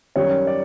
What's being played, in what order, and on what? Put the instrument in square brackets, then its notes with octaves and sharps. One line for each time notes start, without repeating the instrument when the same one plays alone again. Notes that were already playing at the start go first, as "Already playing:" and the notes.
[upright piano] F#2 D#3 G3 C#5
D5